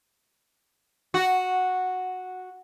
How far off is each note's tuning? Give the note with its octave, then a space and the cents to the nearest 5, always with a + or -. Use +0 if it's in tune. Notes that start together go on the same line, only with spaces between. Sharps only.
F#4 -5